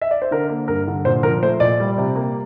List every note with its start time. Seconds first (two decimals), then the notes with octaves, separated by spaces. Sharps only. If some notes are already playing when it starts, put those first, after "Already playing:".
0.01 E5
0.11 D5
0.22 C5
0.31 D3 A#4
0.50 A#3
0.68 G2 A#4
0.88 D3
1.05 A#2 C5
1.23 F3 A#4
1.42 A3 C5
1.60 A#2 D5
1.80 G3
1.98 C3
2.16 A#3